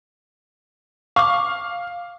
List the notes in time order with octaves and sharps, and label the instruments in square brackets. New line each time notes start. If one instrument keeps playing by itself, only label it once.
[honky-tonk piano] F5 [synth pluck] C#6 D6